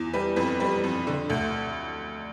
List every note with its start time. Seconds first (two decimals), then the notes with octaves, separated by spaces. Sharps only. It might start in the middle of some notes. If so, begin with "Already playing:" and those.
Already playing: E2
0.13 G3 B4
0.36 F2 B4
0.60 G3 B4
0.84 F2
1.07 D3
1.30 D2